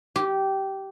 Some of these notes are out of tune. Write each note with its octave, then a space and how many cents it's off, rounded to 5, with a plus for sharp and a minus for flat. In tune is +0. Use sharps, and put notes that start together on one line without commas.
G4 -15